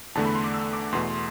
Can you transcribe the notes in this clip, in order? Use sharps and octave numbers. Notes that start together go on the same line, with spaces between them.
E2 D3 A3 A5
B5
C6
D6
E6
D6
E2 B2 A3 C6